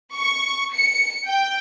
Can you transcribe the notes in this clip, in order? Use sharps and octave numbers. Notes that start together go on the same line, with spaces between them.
C#6
C#7
G5